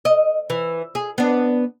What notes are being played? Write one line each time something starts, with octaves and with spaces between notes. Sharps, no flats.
D#5
E3
G#4
B3 D4